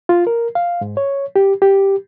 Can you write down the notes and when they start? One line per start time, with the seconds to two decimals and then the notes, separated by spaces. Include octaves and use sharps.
0.09 F4
0.27 A#4
0.55 F5
0.81 G#2
0.97 C#5
1.36 G4
1.62 G4